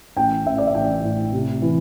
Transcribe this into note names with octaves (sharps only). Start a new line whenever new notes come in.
A1 G5
A1 E5
D5
E5
A1 G5
A2
C3
E3